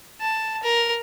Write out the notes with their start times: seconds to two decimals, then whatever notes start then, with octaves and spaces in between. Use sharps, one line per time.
0.21 A5
0.63 A#4